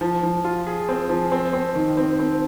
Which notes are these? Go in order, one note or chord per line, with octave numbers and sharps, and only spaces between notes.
F3
F3
F4
G#4
C4
F3
C4
C4
D#3
C4
C4